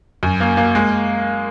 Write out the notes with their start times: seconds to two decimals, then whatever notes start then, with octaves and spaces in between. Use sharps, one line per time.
0.23 F#2
0.40 A#3
0.57 A#3
0.75 G#3